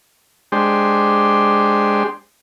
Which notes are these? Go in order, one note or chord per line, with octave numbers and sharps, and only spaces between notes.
G#3 D4 G4 C5